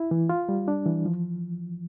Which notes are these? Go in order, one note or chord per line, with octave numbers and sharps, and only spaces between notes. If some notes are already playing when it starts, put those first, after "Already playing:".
Already playing: E4
E3
F4
G3
D4
E3
F3